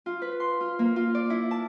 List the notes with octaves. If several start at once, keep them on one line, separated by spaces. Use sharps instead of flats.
F4
B4
C6
F4
A#3
F4
D5
E4
A5